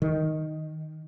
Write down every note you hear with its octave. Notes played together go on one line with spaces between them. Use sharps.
D#3